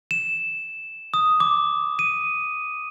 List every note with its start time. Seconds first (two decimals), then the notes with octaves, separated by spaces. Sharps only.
0.11 E7
1.14 D#6
1.40 D6
1.99 D#7